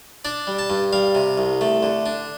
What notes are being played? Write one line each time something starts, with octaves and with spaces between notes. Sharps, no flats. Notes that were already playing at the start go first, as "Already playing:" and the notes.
D4 D5
G3
A5
G2
G3 F5
C3
C2
A3
D3
D4